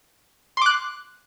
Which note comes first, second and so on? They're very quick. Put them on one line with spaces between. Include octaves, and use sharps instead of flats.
C6 D6 F#6